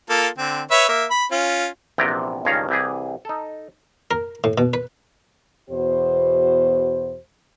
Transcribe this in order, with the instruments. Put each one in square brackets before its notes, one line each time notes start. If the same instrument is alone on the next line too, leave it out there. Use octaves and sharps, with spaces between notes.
[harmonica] A#3 F4 A4
D3 C4
B4 C#5 E5
A#3 E5
B5
C#4 F4
[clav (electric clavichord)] A#1 C3 E3 B3 G5 A#5
C#2 G2 D#3 C#4 F5 A#5
C2 E3 G4 G#4
D#4 A4
[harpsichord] A#4
A2
B2
B4
[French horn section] E2 B2 F#4 C5